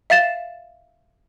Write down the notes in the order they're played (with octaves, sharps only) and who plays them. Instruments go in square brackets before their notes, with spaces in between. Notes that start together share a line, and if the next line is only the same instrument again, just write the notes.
[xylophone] E5 F5 A6 E7